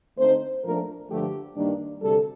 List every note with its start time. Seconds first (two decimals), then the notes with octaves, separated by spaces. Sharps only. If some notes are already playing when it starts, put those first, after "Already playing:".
0.17 D3 A3 C4 D#4 C5
0.63 A#2 F3 A3 D4 A#4
1.09 G2 D3 F3 A3 G4
1.56 G2 D#3 G3 A#3 D4
2.02 D2 C3 G3 A4